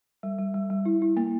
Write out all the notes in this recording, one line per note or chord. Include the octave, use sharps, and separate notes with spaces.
G3
G3
G3
G3
E4
E4
A#3